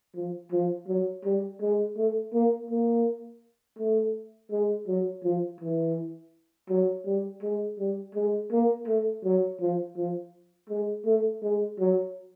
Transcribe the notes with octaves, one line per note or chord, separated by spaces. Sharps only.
F3
F3
F#3
G3
G#3
A3
A#3
A#3
A3
G#3
F#3
F3
E3
F#3
G3
G#3
G3
G#3
A#3
A3
F#3
F3
F3
G#3
A3
G#3
F#3